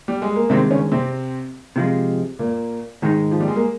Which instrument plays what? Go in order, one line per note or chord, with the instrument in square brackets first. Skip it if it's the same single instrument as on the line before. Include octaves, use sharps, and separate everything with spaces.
[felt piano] G3
G#3
A#3
[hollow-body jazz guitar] G2 D#3 G#3 [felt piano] C3 C4
[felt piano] C#3 C#4
C3 C4
[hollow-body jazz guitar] C3 F3 G#3
[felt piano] A#2 A#3
[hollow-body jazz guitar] G#2 D#3 G#3 D#4
[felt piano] F3
G3
G#3
A#3